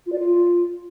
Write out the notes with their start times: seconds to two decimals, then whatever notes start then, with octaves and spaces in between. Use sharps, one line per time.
0.06 F4
0.12 D5
0.18 F4